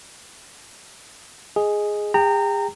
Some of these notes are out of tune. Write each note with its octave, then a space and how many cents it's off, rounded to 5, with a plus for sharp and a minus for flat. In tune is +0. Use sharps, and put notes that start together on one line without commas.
G#4 +0 D#5 +0
G#4 -45 G5 +0 A#5 -25